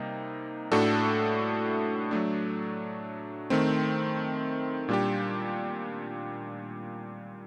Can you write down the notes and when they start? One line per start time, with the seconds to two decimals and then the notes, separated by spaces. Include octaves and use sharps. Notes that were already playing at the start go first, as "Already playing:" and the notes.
Already playing: C3 G3 A#3 D#4
0.72 A2 A3 D4 F#4 A4
2.11 F#3 A3 D4
3.50 D#3 A3 C4
4.89 A#2 G3 D4 G4